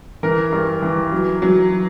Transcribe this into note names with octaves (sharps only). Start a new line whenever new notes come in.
E3 A#4
G2
E3
F#3
F#3